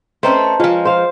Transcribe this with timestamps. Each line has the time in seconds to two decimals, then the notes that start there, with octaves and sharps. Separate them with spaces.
0.23 A3 C4 C#4 B4 C5 D#5 A#5
0.60 F3 G#3 C#4 F4
0.85 C5 F5